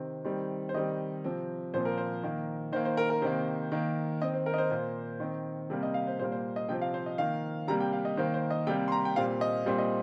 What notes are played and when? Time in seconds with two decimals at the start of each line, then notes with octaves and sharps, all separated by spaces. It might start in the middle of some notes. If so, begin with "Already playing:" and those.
Already playing: C3 D#3 C4
0.25 D#3 G3 C4
0.69 C5
0.74 D#3 G3 C4 D#5
1.24 C3 F3 C4
1.74 A#2 F3 C4 C5
1.85 A#4
1.98 C5
2.23 D#3 A#3
2.72 D#3 C5
2.76 A#3
2.85 C5
2.97 A#4
3.10 A#4
3.22 C3 D#3 A#3 C5
3.72 D#3 A#3
4.21 D#3 C4 D#5
4.34 C5
4.46 A#4
4.54 D#5
4.58 C5
4.71 A#2 A#3 C5
5.20 D#3 C4
5.70 C3 G3 A#3
5.83 D#5
5.94 F5
6.07 C5
6.19 A#2 G3 A#3 C5
6.32 C5
6.56 D#5
6.69 C3 F3 C4 G5
6.82 F5
6.94 C5
7.06 D#5
7.18 D#3 A#3 F5
7.68 C3 G3 A#3 A#5
7.80 G5
7.93 F5
8.05 D#5
8.17 D#3 A#3 C5
8.34 C5
8.51 D#5
8.67 C3 G3 A#3 G5
8.88 C6
8.92 A#5
9.05 G5
9.16 A#2 G3 C4 F5
9.41 D#5
9.66 A#2 G3 C4 C5
9.78 D#5